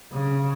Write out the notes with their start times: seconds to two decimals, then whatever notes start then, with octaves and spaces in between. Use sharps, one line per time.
0.12 C#3